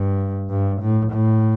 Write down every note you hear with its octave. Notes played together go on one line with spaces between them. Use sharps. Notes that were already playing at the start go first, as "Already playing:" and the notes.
Already playing: G2
G2
A2
A2